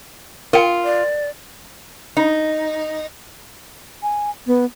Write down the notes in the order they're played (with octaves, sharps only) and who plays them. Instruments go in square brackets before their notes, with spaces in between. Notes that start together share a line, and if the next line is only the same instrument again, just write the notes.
[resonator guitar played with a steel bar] F4 [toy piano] A#4 G5
[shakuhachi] D5
[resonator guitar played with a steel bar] D#4
[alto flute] G#5
B3